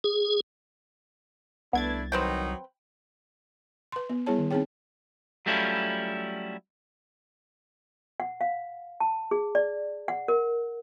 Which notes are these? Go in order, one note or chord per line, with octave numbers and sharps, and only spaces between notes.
G#4
C2 A3 B3 D4 E4 G#6 A6
D#3 F#3 C4 D#4 B4 G5
B4 C6
B3
G3 B3 E4 G#4 C#5 A5
D#3
C4 D#4 G#4 C#5 G5
F#3 G3 A3 C#4 E4 F4
F#5
F5
A5
G#4
D5
F#5
A#4